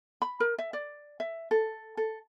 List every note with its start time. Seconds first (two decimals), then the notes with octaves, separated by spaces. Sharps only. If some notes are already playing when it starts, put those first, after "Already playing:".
0.22 B5
0.40 A#4
0.58 E5
0.73 D5
1.20 E5
1.51 A4
1.97 A4